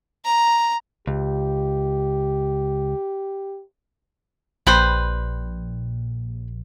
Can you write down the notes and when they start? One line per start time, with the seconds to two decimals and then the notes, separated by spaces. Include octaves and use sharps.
0.25 A#5
1.07 C#2 G4
4.67 A#1 G3 B4 C5